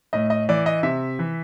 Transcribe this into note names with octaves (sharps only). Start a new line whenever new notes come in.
A2 D#5
D#5
E3 D5
D#5
C3 E5
E3